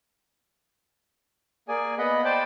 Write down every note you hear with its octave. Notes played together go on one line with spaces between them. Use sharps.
A#3 G#4 D5 G#5
B3 D#5 F#5 B5
C5 D5 G5 A5 B5